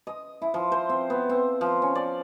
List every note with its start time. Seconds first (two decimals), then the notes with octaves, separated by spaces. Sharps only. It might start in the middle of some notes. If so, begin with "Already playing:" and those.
0.07 D#5
0.42 E4
0.54 F3
0.72 C5
0.89 C4
1.10 B3
1.29 C4
1.61 F3
1.82 C#4
1.95 D5